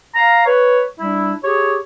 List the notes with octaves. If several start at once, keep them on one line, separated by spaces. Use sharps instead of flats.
F5 A#5
B4 C#5
G3 D4 E4
G4 G#4 C#5